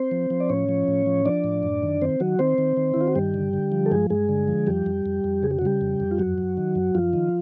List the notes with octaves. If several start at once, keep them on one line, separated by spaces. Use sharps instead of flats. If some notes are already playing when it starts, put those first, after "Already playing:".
Already playing: C4 C5
F3
F3
D5
A2 C#4 C#5
F3
A2
F3
F3 D4 D5
A2
F#2
D#3
D#3 C4 C5
D#3 F#3 F#4
D#3 C4 C5
D#3
D#3
E4
D#3 F4
F#4
G2 G3 G4
D3
D3
F3
A4
G2 G#3 G#4
G2 G#3 G#4
D3
F3
F2 G3 G4
F2
F2
F2
C#3 G#4
G4
F#4
C#3 G3 G4
F2
F2
F4
F#2 F#3 F#4
F#2
D#3
F#2
F#2 F3 F4
D#3